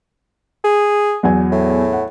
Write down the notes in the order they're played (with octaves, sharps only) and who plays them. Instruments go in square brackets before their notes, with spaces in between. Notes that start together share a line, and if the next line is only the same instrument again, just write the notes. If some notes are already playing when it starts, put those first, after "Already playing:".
[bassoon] G#4
[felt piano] E2 F#3 G#5
[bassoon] A2
[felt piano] F#5